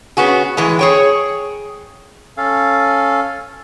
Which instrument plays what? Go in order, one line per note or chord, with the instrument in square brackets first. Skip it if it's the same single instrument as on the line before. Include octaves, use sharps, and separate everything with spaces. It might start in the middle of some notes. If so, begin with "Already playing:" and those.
[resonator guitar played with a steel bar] B3 C#4 F#4 G#4
A2 E3 G#3
G#4 C#5 G5
[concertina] C#4 A4 F5